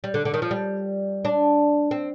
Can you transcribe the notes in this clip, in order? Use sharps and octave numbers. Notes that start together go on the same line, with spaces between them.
G3
D3
D3
D#3
F3
G3
D4
C4